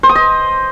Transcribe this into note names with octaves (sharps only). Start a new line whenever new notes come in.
C5
D#6
D#5